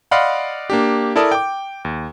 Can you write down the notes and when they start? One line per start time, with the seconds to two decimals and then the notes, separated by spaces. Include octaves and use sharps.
0.11 D5 D#5 F5 F#5 B5 C6
0.70 A#3 D4 G4
1.16 E4 A4 A#4 D5 A5 D#6
1.32 G5 D6
1.85 D#2